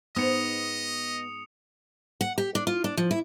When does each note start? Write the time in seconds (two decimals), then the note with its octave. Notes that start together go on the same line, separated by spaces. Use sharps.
0.16 G#2 B3 D#5 D#6 C#7 F7
2.21 F#5
2.38 G4
2.55 D4
2.67 F4
2.84 D4
2.97 F3
3.11 E4